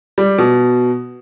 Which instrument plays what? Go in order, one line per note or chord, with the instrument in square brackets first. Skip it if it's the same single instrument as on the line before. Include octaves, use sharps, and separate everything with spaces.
[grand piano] G3
B2